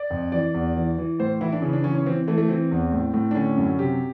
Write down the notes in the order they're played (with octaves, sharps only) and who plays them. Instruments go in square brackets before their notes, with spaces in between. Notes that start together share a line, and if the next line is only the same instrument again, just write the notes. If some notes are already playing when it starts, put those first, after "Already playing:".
Already playing: [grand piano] D5
F2
E3 D5
E2
E3
E3
A2 C5
E3 E4
D4
C#3 C#4
D4
E3 C#4
C#4
E3 C4
E3 A3
A3
E3 C4
E2
A2
A2
D4
D3 C#4
F#2
C3 G4